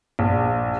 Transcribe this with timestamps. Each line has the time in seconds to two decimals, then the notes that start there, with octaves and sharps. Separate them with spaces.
0.19 A#1